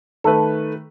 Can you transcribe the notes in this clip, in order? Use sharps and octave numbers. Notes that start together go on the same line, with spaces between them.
D#3 A3 A4 B4